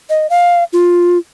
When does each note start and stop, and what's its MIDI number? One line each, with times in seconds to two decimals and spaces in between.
0.10 0.27 75
0.30 0.64 77
0.73 1.18 65